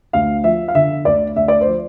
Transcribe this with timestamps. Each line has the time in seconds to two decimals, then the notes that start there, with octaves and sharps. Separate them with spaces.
0.13 D2 F5
0.44 F3 E5
0.68 F5
0.75 D3 E5
1.05 D2 D5
1.36 D2 E5
1.48 D5
1.61 C5
1.67 F3